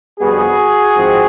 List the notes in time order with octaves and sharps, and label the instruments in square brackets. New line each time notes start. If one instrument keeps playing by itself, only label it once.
[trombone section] F2 D3 G3 B3 F#4 G#4
G#2 F3 G#3 C4